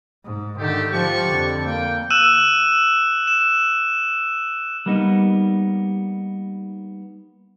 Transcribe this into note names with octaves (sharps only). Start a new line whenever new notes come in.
G#2
G#2 D3 D#3 A3 G4
F3 G4 D5 F#5 C#6
F2 D3
A#3 G5
E6 F#6 D#7 E7
E7
G3 A#3 B3 D#4